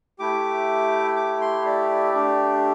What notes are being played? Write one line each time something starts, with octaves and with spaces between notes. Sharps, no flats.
A3 E4 G4 D6
D6
C6
D5
A3 D4 G4